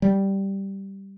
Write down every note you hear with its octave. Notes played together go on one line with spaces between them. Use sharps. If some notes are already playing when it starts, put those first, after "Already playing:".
G3